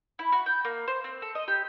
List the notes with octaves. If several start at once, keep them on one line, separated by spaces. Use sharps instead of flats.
E4
F#4
G5
A#3
C5
C4
A4
D#5
G4